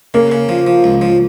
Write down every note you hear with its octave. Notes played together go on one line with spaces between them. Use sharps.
C#3 A#3
C#3
F3
F3
C#2
F3